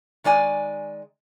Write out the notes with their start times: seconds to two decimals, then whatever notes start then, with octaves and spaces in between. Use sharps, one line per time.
0.24 D#3 G#3 D5 G#5